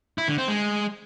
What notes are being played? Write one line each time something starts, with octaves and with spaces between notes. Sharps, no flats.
E4
D3
C4
G#3